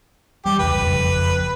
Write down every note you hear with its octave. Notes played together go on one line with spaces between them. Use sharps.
E3 G3 G4
E1 C#2 B4
F#1 F2